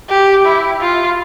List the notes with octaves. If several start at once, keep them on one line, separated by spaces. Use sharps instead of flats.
G4
E4
F4